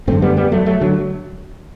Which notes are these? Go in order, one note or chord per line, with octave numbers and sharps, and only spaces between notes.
F#2 D3 A3 C4
G3 B3
G3 B3
F#3 A3
F#3 A3
D3 F#3